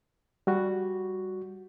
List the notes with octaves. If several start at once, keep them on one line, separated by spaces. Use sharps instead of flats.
G3 F#4